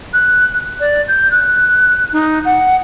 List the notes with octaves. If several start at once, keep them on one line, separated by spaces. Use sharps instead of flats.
F#6
D5
G6
F#6
D#4
F#5